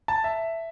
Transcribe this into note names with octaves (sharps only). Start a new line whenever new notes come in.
A5
E5